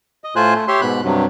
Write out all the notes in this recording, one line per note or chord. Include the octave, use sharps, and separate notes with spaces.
D#5
A2 A3 F4 C5 G#5 F#6
A3
G4 C#5 E5 C6
G#2 B2 B5 F#6
G2 C3 F#3